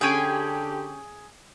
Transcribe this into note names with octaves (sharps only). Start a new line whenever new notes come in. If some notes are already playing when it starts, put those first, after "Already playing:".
D3 C#4 G4 G#4 G5 G#5